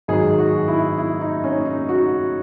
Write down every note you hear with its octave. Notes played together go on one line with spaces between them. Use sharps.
G#2 D#3 F#3 G#4
F#4
E4
E4
D#4
C#4
D#4
F#4